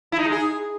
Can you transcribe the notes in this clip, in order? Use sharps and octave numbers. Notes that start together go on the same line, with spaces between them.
E4
D#4
G#3
G#4